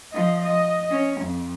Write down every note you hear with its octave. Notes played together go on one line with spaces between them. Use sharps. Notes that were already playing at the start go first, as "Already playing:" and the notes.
F3 D#5
D#5
C#4
F2